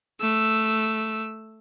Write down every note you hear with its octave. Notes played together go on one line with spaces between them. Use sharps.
A3 E6